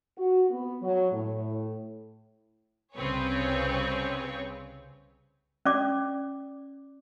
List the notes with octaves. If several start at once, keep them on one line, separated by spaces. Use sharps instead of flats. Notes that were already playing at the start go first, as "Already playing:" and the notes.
F#4
B3
F#3
A2
C2 C#3 C4 G#4 B4 C#5
C#4 D5 D6